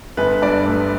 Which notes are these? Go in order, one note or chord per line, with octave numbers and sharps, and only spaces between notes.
G1 B4
G2 D5
A3 B4